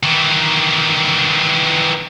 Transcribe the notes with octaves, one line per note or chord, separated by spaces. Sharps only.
D#3 E3